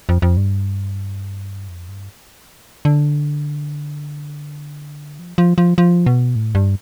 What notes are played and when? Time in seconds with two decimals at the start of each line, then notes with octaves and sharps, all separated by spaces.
0.09 F2
0.22 F2
0.37 G2
1.68 F2
1.88 G2
2.85 D3
5.19 F3
5.38 F3
5.58 F3
5.78 F3
6.06 B2
6.36 A2
6.55 G2